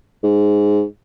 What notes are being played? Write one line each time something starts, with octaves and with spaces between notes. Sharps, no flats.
G#2